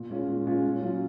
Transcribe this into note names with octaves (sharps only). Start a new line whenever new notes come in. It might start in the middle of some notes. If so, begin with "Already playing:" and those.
Already playing: A#2
G#3 C#4 F4
A#2
G#3 C#4 F4
A#2
F#3 C#4 F4